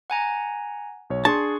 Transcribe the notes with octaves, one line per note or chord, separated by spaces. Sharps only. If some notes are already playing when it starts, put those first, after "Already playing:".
F#5 G#5 A#5
B1 C#5
D4 G#4 A5 C6 C#6